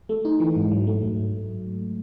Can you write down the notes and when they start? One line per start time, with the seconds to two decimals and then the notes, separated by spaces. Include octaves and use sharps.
0.09 A3
0.25 D#4
0.40 E3
0.56 G#2
0.71 F#3
0.87 A3
1.03 G#2